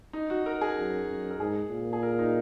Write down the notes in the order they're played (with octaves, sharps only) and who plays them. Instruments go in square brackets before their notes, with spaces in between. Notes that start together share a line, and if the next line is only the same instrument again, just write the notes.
[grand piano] D#4
F#4
A#4
G#4
[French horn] F#2
F#2
[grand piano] A#4
[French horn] G#2 [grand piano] G#4
[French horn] A#2
[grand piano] G#4
A#4
D#4